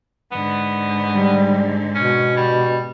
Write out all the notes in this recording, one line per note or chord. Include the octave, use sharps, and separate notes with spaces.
G#2 D3 B3
G3
B2 C#4
G3